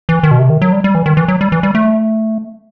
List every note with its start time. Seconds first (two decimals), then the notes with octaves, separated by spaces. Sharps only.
0.09 E3
0.23 D#3
0.31 B2
0.39 C3
0.50 D#3
0.62 F#3
0.73 G3
0.84 G3
0.95 E3
1.06 D#3
1.17 E3
1.28 F#3
1.41 G3
1.52 E3
1.63 G3
1.75 A3